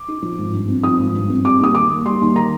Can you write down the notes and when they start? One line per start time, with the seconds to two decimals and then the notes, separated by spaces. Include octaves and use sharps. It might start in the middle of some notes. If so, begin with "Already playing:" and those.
Already playing: D6
0.08 D#4
0.22 F3
0.38 G#1
0.53 G2
0.68 C4
0.83 F3 D#6
0.99 G#1
1.14 G2
1.30 C4
1.45 G3 D6
1.59 D#2 D#6
1.75 D#3 D6
1.90 A#3
2.06 G3 C6
2.21 D#2
2.35 D#3 A#5